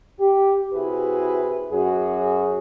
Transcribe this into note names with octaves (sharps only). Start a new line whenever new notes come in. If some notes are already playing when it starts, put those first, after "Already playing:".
G4
C3 E4 F#4 G#4 B4
F#2 F#4 G#4